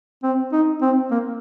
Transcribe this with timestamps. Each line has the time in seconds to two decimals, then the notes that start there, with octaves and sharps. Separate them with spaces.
0.23 C4
0.53 D#4
0.82 C4
1.11 A#3